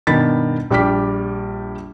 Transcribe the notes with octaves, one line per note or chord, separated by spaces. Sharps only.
G2 B2 D#3 B5 A6 B6
A#1 G3 G5 D6 F6 B6